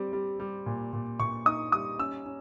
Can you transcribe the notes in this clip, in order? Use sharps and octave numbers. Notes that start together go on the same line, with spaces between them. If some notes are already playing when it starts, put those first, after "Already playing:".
Already playing: G3 C4
G3
G3
A#2
A#2
A#2 C#6
D#4 D#6
G3 D#6
C#4 E6
C#4